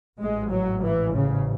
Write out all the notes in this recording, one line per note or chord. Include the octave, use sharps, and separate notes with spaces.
A1 G#2 G#3
F#3
E3
C#3